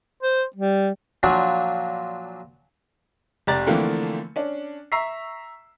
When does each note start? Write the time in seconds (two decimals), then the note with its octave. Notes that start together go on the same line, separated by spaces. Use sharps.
0.23 C5
0.56 G3
1.23 A#2 F3 F#3 D4
3.47 F1 G4 D5 A#5 A6
3.67 D3 E3 F3 A3 A#3 C4
4.36 C#4 D4
4.92 E5 A#5 C#6 E6 B6 C7